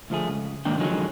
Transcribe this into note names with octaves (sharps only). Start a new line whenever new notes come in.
D2 F3 A3 G#4
C#2
G#2 D#3 A#3 D4 G5
D3 D#3 F3 F#3 G#3 C#4